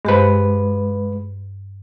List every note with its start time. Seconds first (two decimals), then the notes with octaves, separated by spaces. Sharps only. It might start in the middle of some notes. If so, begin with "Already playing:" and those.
0.05 G2 G#3 G4 B4 C5